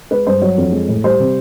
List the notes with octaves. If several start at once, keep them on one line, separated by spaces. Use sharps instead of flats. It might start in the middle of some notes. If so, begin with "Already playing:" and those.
G#3 B4
G2 C5
F#3 C#5
F2
G#3
A2
G3 C5
C3